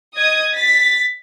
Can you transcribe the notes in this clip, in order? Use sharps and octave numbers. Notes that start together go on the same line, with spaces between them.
D#5 D#6 G#6
A6 B6